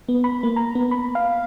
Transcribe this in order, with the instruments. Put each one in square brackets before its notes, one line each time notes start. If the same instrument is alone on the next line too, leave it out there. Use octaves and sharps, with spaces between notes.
[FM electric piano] B3
B5
A#3
A#5
B3
B5
F5